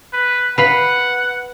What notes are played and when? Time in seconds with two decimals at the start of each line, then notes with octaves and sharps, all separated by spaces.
0.13 B4
0.58 B4 F5 F#5 B5